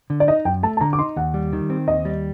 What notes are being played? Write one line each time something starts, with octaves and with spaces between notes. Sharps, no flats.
D3
D5
D#4 D#5
F#2 G5
A3 A5
A5
D3 A#5
D6
D#4 C6
D#2 F#5
G3
D#3
C4
D#2 D#5
G3